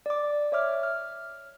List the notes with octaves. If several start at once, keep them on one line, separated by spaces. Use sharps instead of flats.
D5 D6
C#5 E5 D6 F6
F6